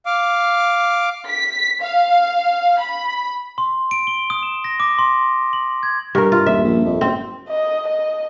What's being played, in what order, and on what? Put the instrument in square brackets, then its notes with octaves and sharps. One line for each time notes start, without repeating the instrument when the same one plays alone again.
[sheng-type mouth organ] F5 D6
[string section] B6
F5
B5
[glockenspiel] C6
D7
G7
D#6
E7
A#6
D6
C6
F#7
G#6
[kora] G2 A#4
F4
[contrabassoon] D#1 [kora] E5
[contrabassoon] A#1
F2
[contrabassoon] F#1 [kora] C4
[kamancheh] D#5
D#5